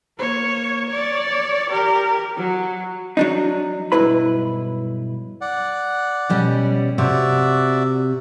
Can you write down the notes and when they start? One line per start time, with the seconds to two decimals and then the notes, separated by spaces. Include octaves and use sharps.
0.18 A#3 C#5
0.88 C#5 D5
1.70 G4 A#4
2.36 F#3
3.17 F#3 D4 D#4
3.92 B1 G2 E4 B4 B5
5.41 D5 F#5
6.30 B2 G3 C#4
6.98 C3 F#4 D5 E5